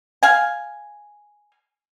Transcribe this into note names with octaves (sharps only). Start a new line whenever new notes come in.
F5 G#5